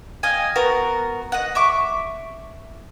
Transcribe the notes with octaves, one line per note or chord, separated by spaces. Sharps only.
D#5 F5 G5 G#5
B3 F#4 A#4
D#5 F#5
E5 C#6 D6